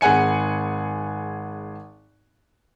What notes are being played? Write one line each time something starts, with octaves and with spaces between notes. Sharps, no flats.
G#1 G#4 F#5 G#5 C#7